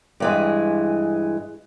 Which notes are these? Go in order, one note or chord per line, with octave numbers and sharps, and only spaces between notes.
G2 E3 G#3